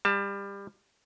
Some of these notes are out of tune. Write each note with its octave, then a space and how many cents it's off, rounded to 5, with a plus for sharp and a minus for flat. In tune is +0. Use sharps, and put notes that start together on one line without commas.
G3 +25 A5 +15